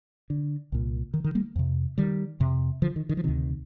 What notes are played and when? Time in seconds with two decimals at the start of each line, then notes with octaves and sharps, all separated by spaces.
0.30 D3
0.72 C2 A#2
1.14 D#3
1.24 D#3
1.35 G3 A#3
1.56 F2 C3
1.98 D#3 G3
2.40 F2 C3
2.82 D3 F3
2.96 D#3
3.09 D#3
3.17 F3
3.24 D2 C3 D#3